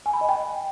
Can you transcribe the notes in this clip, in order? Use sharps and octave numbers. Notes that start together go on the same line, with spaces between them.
G#5
B5
D#5
G5